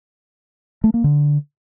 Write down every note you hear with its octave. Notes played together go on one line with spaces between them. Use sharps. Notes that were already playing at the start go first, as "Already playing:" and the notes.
A3
A#3
D3